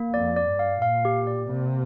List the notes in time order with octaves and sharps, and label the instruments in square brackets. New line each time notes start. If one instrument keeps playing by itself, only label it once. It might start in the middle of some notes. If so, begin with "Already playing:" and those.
Already playing: [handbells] A#3
[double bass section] F2 [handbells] D5
[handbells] D5
[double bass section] G2
[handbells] F5
[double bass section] A#2 [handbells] F5
[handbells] G4
D5
[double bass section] C3 [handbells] A#3